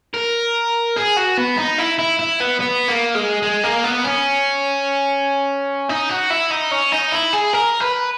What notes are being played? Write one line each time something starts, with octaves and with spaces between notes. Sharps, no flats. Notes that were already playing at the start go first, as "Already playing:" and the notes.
A#4
G#4
F#4
B3
D#4
E4
E4
E4
B3
B3
A#3
G#3
G#3
A#3
B3
C#4
D#4
F#4
E4
D#4
C#4
D#4
E4
G#4
A#4
B4